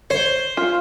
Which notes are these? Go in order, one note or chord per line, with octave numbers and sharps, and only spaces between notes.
C5 C#5
F4